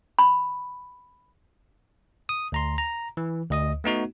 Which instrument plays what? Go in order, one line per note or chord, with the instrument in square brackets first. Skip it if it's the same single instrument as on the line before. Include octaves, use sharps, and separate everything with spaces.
[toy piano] B5
[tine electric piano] D#6
D2 A#5 C6
A#5
E3
D2 D#5 D#6
A3 B3 D#4 F#4